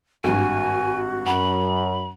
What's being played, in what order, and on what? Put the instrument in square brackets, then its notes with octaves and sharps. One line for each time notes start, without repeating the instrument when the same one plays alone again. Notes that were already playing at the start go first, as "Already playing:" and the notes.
[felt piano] G#1 G2 [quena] F#4 [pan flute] G#5
[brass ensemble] F#2 [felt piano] F#5 [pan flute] B5